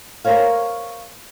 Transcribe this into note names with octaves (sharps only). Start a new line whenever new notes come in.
A#4 C5 C#5 F5